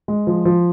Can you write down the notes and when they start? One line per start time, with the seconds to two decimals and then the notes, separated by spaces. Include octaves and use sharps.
0.08 G#3
0.27 F3
0.45 F3